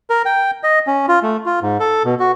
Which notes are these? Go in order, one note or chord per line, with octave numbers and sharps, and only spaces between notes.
A#4
G5
D#5
C#4
F4
A3
F4
G#2
A4
B2
F#4